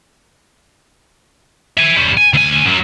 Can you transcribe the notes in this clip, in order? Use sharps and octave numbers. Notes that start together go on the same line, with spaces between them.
E5 G#5
G3 C#4
G#5
D2 G#5
F#2 F#3